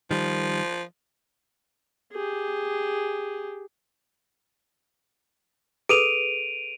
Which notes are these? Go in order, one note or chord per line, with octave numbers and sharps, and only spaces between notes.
D#3 F3 G3
G4 G#4
G#4 A4 B4 D7 D#7 F7